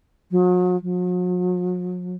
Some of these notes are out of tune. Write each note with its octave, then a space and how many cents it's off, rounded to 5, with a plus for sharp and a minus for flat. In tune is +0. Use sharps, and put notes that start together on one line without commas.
F#3 -40
F#3 -45